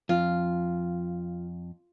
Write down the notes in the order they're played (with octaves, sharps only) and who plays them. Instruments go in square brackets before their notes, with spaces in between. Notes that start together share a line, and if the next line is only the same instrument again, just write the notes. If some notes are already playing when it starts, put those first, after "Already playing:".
[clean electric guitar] F2 [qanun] F4